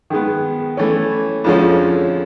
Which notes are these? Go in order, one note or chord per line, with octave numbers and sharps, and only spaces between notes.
D#3 G#3 B3
E3 A3 C#4
F2 D3 F3 G#3 C#4